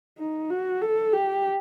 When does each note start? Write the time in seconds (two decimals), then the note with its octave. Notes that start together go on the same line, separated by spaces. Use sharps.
0.19 D#4
0.50 F#4
0.82 A4
1.14 G4